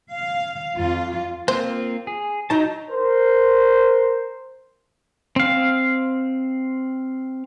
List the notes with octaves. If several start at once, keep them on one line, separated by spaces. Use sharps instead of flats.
F5
F2 F4
A#3 C4 F4 C5
G#4
F#3 D#4 A5 A#5
A#4 C5
C4 F5